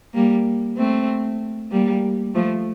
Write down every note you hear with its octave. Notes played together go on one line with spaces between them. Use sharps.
G3 A#3
A3 C4
G3 A#3
F3 A3